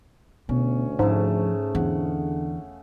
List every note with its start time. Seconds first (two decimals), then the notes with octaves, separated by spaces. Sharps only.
0.49 D2 B2 C#4
0.99 G#2 C#3 F3 A3 A5
1.75 E2 D3 F#5